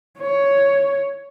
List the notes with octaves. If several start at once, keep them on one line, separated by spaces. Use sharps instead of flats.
C#5